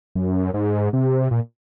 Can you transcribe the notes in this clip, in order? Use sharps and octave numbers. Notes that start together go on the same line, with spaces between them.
F#2
G#2
C3
A#2